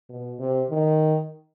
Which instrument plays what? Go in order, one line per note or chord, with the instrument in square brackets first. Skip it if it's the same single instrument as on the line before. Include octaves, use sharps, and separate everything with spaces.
[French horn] B2
C3
D#3